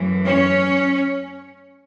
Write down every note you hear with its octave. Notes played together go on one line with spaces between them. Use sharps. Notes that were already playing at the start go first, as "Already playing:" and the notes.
Already playing: F#2 E3 A3
C#4 C#5